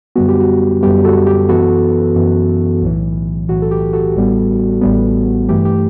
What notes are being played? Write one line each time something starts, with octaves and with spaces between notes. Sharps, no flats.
F#2 D3 G3 B3 F#4
G4
F#4
F#2 D3 G3 B3 G4
F#4 A4
G4
F#2 E3 B3 F#4 A4
F#2 E3 B3
B1 A2 E3
B1 A2 E3 F#4
A4
G4
F#4 A4
A1 A2 G3 B3
A1 A2 G3 B3
G2 E3 A3 G4
G4